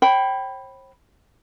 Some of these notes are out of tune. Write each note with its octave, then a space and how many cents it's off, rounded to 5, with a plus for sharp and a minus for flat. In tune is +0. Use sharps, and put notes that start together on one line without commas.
C5 +45 G5 -15 B5 +0